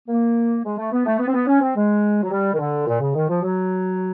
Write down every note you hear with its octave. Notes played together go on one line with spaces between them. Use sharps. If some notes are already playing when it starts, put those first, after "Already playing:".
A#3
G#3
A3
B3
A3
B3
C4
B3
C#4
C4
G#3
F#3
G3
D#3
D3
A#2
C#3
D#3
F3
F#3